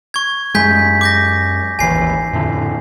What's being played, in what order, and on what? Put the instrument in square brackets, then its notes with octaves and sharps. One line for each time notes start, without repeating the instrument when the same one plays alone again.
[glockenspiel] C#6 G#6
[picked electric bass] F#2 G#3 [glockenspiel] G#5 G6 B6
[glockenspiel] D6 G6 A#6
[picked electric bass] G#1 D#2 E3 [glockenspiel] G#5 C7
[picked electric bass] F2 A2 D3